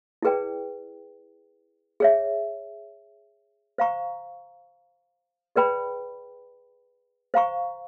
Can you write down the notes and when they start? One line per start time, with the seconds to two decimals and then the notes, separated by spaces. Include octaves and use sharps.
0.22 E4 G#4 B4 D5 G5
2.00 G#4 C#5 E5
3.78 C5 F5 A#5 C#6
5.56 G#4 B4 D5 G5 B5
7.34 C5 F5 A#5 C#6